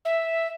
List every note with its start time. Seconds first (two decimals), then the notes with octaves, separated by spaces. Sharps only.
0.05 E5